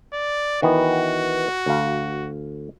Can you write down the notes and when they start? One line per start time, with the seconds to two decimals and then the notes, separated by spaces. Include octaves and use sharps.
0.13 D5
0.62 D#3 E3 B3 F#4
1.66 D2 F5